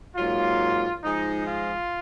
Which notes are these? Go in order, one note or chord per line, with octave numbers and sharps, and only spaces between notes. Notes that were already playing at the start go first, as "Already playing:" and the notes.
G#2 F#3 A#3 F4
G#2 F3 G#3 D#4
F4